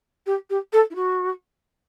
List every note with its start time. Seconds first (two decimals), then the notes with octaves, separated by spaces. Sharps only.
0.26 G4
0.49 G4
0.72 A4
0.90 E4
0.95 F#4